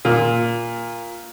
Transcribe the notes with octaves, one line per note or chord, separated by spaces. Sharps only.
A#2